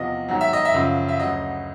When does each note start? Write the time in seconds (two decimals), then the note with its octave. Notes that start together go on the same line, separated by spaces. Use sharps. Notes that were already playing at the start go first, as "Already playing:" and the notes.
Already playing: E2 C3 F3 D#5
0.28 G#2 D#3 F#3
0.41 E5
0.53 D#5
0.65 E5
0.74 F#2 C#3 F3
1.09 E5
1.20 D2 C#3 F#3 D#5